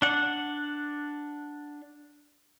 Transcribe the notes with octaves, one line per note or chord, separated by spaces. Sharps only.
D4 F#5